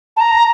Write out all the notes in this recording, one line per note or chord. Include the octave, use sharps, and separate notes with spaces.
A5
A#5